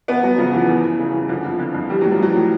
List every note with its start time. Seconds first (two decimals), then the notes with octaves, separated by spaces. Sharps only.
0.08 E2 B3
0.23 E2 F#3
0.38 C#3 F3
0.53 E3
0.69 E2
0.84 E2
0.99 C#3
1.14 E3
1.29 D3 F3
1.45 F2
1.59 D3
1.74 F2
1.90 E3 G3
2.01 A2 F#3
2.12 F3
2.20 E3 F#3
2.36 A2